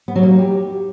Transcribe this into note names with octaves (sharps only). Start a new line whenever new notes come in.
B3
F#3
A#3
D#4
G4